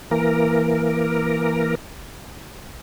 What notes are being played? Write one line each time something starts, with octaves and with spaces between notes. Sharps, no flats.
E3 A#3 A#4